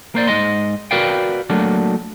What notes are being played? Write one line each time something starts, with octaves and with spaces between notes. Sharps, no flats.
A#3 C5 D5
G#2 F3 D#5 C6
F#4 A#4 B4 D5 F5 G5
F#3 A3 A#3 D4